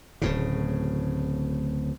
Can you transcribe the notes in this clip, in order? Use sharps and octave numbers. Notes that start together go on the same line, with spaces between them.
D1 A2 C#3